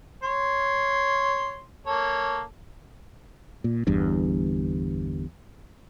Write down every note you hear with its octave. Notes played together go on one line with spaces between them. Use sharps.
C#5 C6
A#3 A4 C#5
A#2
G1 E2 G2